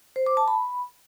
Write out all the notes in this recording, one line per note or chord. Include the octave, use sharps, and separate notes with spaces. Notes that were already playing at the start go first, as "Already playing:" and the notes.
C5
D6
A5
B5